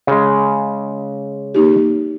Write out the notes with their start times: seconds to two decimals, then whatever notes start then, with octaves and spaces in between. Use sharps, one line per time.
0.07 C#3 G#3
1.55 A#3 D#4 G4